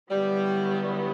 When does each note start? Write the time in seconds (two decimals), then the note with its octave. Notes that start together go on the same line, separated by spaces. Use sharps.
0.11 D3 F#3 G3 B3 E4
0.83 G3